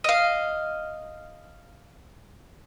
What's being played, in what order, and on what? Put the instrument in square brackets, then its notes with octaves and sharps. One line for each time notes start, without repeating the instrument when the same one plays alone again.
[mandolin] D#5 F5